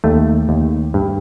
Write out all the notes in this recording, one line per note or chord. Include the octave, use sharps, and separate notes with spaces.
D#2 A3
D#2
G2